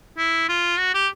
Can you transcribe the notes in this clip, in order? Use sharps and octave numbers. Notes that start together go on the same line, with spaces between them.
E4
F4
F#4
G4